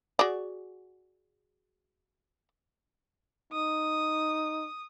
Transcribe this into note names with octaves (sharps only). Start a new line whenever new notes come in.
F#4 G#4 D5
D#4 D#6